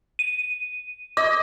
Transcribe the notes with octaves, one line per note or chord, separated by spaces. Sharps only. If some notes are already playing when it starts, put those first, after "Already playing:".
D#7
D#5 D6